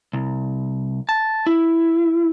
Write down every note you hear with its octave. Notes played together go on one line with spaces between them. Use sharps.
C2
A5
E4